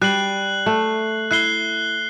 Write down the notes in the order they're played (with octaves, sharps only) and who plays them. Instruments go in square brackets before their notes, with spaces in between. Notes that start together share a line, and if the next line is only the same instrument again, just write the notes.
[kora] G3 [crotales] F#6 C7 F#7
[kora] A3
[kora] E4 [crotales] F#6 C7 G7